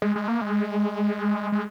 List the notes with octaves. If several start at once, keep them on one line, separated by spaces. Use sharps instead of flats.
G#3
G#3
A#3
G#3
G#3